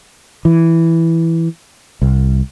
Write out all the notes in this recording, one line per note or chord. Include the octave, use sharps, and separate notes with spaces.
E3
C2